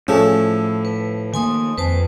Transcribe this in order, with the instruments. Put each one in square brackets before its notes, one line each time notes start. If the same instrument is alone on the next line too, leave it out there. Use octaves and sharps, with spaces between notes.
[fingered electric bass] A2 [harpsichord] F3 A3 [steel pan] C#4 G#4 A5 [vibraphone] E6
[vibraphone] B4
[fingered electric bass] D#3 A#3 [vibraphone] G#5 C6 D#6
[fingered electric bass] F2 [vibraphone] B4 C5 A5